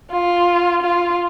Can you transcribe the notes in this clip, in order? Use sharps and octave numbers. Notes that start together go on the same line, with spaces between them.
F4
F4